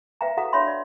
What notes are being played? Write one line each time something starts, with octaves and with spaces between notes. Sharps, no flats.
B4 E5 F5 G5 A#5
F#4 A4 F5 F#5 A#5
D4 C#5 E5 B5 C6
D5